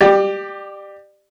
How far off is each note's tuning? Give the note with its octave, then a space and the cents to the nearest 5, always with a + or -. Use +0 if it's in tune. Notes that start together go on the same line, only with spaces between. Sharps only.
G4 +0 D5 +30